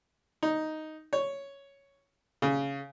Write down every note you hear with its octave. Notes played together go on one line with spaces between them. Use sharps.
D#4
C#5
C#3